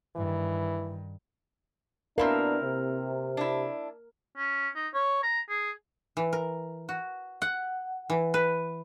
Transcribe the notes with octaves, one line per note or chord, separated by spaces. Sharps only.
G2 D#3 E3
B2 B3 C4 D4 E4 A#4 F5
C3
D4 E4
C#4
D#4
C#5
A#5
G#4
E3
A#4
F#4
F#5
E3
B4